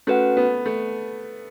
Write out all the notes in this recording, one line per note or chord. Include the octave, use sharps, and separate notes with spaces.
A3 C#4 F#4 B4 F#5
B3
A3